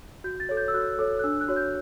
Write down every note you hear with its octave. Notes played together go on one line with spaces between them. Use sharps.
F#4 G6
A6
A4 C#5
G6
E6
F#4 F#6
A4 C#5
F#6
D4 E6
F#6
F#4 C#5
G6